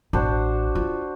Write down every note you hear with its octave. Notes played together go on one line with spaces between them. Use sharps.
A1 D4 F#4 C5
F4